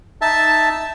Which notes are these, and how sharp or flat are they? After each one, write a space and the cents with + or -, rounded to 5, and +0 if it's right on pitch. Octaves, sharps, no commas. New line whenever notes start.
D#4 +0 E5 -5 A5 +0